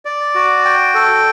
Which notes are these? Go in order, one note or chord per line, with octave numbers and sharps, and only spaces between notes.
D5
F#4
G5
A4